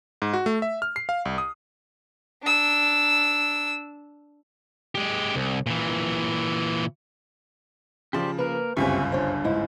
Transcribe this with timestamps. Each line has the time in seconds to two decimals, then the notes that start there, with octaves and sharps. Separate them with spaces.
0.22 G#2
0.33 F#4
0.46 A3
0.62 E5
0.82 F6
0.96 C7
1.09 F5
1.25 C2
1.38 D#6
2.43 D4 E6
4.95 G#3 G4
5.35 C2
5.66 A#2 E3
8.13 C#3 F3 G4 C5 D5
8.38 A#3 A#4 B4
8.77 G1 C#2 F#2 C4 G4 E5 G#5 C#6
9.12 D4 C5 C#5
9.44 G#2 E4